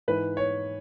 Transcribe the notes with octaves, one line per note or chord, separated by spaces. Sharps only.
G#2 E3 B4
C#5